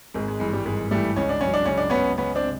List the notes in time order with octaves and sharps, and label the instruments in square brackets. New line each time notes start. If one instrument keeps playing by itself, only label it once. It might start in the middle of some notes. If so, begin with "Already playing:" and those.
[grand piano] G#1 [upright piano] G#3
[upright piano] G#3
[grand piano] G2 E3 [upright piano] G#3
[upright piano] G3
[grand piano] G#1 [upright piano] G#3
[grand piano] G2 E3 [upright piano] G3 A3
[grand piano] C#2 [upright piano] C#4
[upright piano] D4
[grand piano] C#3 F#3 [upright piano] C#4
[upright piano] D4
[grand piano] C#2 [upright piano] C#4
[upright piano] D4
[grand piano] C#3 F#3 [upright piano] B3 C#4
[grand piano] C#2 [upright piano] B3 C#4
[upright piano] C4 D4
[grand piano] C3